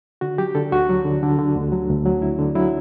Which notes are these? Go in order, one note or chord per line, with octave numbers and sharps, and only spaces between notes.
D3 F#4
F#3 G4
D3 A4
D2 F#4
F#3
D3
D3
D3
D2
F#3
D2
F#3
D3 E4
D3
F#3 E4